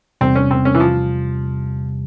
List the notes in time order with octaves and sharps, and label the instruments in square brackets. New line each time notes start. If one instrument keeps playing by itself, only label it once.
[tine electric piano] E2 C3 G3 [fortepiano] C4
[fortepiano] C#4
C4
C#4
E3
F3